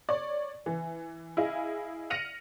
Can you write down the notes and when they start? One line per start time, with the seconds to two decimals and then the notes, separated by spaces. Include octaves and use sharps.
0.09 C#5 D5
0.66 E3
1.37 E4 G#4 D#5 F5
2.10 F6 A#6 C#7 D#7 F7 F#7